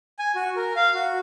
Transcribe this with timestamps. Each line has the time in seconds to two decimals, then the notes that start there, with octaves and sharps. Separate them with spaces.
0.19 G#5
0.35 F#4
0.56 A#4
0.76 F5
0.94 F#4